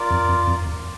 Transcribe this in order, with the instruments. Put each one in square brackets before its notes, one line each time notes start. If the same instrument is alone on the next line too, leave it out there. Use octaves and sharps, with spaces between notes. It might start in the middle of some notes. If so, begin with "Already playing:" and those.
Already playing: [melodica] F4 A#4 D5
[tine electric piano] F2
F2
F2
E2